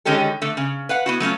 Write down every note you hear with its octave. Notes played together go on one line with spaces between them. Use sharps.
D3 D#3 G#3 C#4 G4 A4
D3 A3
C#3
B4 F5 F#5
B3 E4 F#4
F#3 A3 C#4 F4